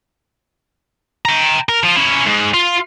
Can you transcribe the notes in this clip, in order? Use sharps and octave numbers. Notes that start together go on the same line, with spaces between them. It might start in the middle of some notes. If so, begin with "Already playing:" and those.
G5 A#5
A#4
F3 F4
C#4 E4
G#2
F4